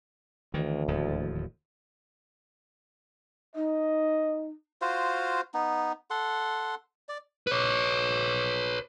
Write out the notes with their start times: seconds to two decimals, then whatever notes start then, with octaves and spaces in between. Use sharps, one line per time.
0.54 D2 D#3 E3
0.88 D1 D#2 F3
3.55 D#4 D#5
4.82 F4 F#4 C5 F5
5.54 B3 D#4
6.10 A4 F#5 C6
7.09 D5
7.47 B4 C#5